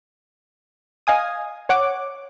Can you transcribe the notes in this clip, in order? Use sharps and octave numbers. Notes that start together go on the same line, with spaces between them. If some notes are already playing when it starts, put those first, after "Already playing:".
D#5 F5 G#5 D#6
C#5 F#5 D6